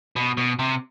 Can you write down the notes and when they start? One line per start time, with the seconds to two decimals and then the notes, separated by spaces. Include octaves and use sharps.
0.16 B2
0.37 B2
0.59 C3